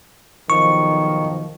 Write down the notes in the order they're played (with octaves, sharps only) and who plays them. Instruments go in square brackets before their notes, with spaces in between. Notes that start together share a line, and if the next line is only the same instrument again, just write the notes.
[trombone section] B1 D#3 F3 [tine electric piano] C#6